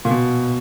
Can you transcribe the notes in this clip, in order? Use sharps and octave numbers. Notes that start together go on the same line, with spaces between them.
A#2
B2